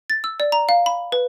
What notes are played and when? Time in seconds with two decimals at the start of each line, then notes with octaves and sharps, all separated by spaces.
0.10 A6
0.24 E6
0.40 D5
0.52 A#5
0.69 F5
0.86 B5
1.12 B4